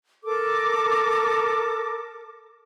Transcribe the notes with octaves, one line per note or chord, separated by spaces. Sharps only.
A4 A#4 D6